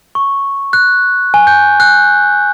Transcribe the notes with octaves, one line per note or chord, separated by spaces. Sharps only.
C#6
F#6
G#5
G6
F#6